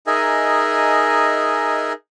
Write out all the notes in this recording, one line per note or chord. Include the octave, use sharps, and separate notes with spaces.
D#4 G#4 A#4 D#5 E5 G#5